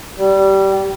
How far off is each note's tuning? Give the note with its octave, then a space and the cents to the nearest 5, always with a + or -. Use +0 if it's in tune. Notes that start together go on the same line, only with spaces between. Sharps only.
G3 -15